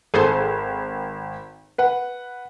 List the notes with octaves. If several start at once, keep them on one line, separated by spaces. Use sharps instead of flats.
G#1 G#4 A4 C5
B4 F#5